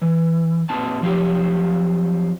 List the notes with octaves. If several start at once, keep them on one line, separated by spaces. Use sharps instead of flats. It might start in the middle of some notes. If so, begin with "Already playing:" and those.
E3
A#2 C4 A5
F3 F#3 C4 F4 G4